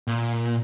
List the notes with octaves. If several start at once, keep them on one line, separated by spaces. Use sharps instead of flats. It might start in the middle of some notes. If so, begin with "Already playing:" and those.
A#2